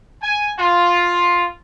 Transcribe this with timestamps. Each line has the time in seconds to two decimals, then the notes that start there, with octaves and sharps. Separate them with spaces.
0.22 G#5
0.58 F4